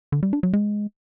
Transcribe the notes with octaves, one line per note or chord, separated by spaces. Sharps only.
D3
G3
D4
F#3
G#3